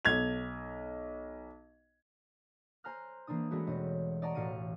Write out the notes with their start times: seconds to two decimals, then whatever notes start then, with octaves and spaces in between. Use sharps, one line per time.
0.05 B1 G#6 F7
2.84 C5 G#5 A#5 F6 F#6
3.27 E3 A#3 C4 D4 D#6
3.51 G#3 A3 B3 D4 F#4
3.67 E1 C4 C#5 D#5
4.22 D5 D#5 F#5 A5 A#5 C#6
4.35 E1 A1 F5 C#7 D#7